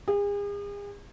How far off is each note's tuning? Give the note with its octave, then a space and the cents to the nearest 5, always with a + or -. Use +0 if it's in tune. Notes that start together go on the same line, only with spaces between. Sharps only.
G#4 -40